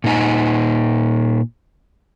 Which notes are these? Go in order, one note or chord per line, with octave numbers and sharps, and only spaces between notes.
A#2 D#4 G#5